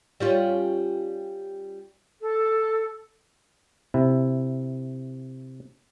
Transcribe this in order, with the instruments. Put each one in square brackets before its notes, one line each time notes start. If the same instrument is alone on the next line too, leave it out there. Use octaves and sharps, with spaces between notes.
[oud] G3 C#4 F4
[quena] A4
[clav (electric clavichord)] C3 E4